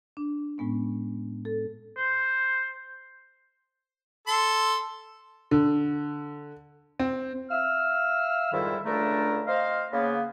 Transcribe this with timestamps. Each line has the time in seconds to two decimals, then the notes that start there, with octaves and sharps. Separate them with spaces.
0.17 D4
0.58 A2 G#3 B3 C#4
1.45 A4
1.97 C5
4.27 A4 C6
5.51 D3
6.99 C4
7.50 E5 F5 E6 F6
8.52 F2 G#2 D#3 G3 E4
8.85 C#2 D3 A3 D4 E4 A#4
9.47 C4 C5 D#5 F5
9.92 C#3 A#3 B3